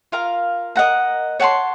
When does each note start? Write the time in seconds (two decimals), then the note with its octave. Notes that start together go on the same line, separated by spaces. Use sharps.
0.12 F4 A#4 F5 A#5
0.76 A#4 D#5 F#5 A#5
1.40 C#5 F#5 A5 C6